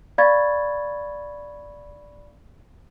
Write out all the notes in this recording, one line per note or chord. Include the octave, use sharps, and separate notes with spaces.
D5 F5 B5 C#6 G#6 A6